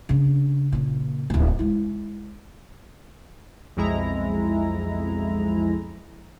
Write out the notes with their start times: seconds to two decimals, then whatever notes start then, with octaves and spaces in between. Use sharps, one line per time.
0.09 C#3 D4
0.72 A#2 C#3
1.30 D1 G#1
1.59 G#3 E4
3.77 B1 F2 G#3 E4 A#5